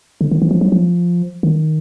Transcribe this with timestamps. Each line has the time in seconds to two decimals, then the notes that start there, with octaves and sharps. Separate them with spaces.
0.21 D3
0.31 D#3
0.42 E3
0.51 F3
0.61 F#3
0.72 F3
1.43 D#3